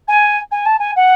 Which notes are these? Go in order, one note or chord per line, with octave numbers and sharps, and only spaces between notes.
G#5
G#5
A5
G#5
F#5